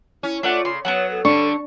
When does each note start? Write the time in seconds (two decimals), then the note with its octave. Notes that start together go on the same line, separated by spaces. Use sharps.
0.23 C#4 E4
0.43 A3 D4 F4 D5 F#5
0.65 C#3 C6
0.85 F#3 B3 C#4 C#5 F#5
1.11 A4
1.25 D3 G3 D4 C#6